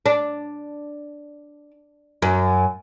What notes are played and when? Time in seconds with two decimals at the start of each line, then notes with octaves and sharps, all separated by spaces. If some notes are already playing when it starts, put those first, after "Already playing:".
0.06 D4
2.22 F#2